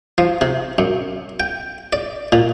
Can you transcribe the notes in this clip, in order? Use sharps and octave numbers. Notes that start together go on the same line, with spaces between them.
F3
C3
F#2
G5
D5
A#2